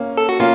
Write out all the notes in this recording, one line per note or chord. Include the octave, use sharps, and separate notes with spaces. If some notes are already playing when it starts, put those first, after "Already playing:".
Already playing: A#3 C#4
A4
F#4
A#3 C#4 F4